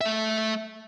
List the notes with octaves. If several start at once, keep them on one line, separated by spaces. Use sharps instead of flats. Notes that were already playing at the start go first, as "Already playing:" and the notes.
A3 E5